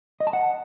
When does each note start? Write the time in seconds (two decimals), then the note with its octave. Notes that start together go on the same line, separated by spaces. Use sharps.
0.20 D#5
0.27 A5
0.33 F#5